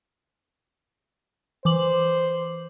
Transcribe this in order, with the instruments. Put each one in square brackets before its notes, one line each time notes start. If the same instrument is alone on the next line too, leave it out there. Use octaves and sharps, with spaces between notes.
[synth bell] E3 D6 F#7 [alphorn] C5